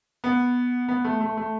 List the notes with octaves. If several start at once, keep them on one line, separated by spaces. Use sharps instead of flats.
B3
B3
A3
A3
A3